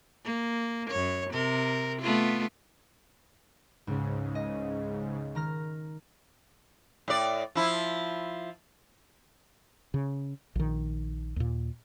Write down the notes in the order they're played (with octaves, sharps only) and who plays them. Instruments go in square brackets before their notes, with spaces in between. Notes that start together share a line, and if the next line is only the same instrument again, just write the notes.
[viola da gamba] A#3
F#2 C#5
C3 A#4
A3 B3 F4
[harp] C#2 [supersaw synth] G#2 C#3
[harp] D#5
D#3 A#5 F6
[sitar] A2 D5
F3 E4
[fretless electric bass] C#3
A#1 D#3
D#2 A#2